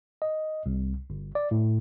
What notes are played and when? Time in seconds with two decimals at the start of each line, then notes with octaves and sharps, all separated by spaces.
0.22 D#5
0.66 C2
1.10 G1
1.35 D5
1.51 A2